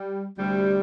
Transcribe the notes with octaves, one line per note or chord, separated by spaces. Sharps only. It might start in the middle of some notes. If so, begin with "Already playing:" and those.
Already playing: G3
D2 C3 G3